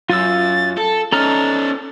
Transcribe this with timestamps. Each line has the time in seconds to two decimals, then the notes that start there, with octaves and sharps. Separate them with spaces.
0.10 F#2 F4 E6 A6
0.78 A4 A5
1.12 C#4 D#4 A4 A#5 F6 A6